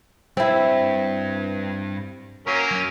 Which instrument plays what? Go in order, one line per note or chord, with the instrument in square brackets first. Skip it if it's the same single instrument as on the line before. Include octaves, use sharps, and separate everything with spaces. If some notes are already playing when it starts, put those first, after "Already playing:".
[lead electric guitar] G2 G4 [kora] C4 E4
[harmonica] F#3 A#3 C#4 [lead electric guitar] A#4
[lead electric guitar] F#2